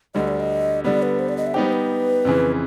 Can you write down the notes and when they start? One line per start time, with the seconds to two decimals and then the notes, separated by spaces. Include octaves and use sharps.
0.15 D2 D3 G3 D#5
0.28 D5
0.40 D#5
0.84 D3 G3 B3 D5
1.03 B4
1.19 C5
1.29 D5
1.37 D#5
1.47 E5
1.54 G3 B3 D#4 G4 C5
1.73 B4
2.25 F2 C#3 E3